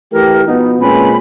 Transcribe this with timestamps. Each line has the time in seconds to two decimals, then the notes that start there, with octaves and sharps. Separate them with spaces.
0.12 E3 A3 G4 A#4
0.47 B2 F3 B3 D#4
0.81 A#2 G#3 C4 C#4 B4 B5